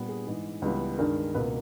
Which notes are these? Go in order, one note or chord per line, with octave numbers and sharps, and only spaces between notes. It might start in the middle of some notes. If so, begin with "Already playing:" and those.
Already playing: A#2 G3 B3
G#4
G#2 E3 G#3
C#2 C#3 E3 G3 B3
G2 D#3 G#3 A#4
C#2 B2 A#3 B4